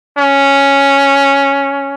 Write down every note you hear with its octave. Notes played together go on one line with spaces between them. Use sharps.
C#4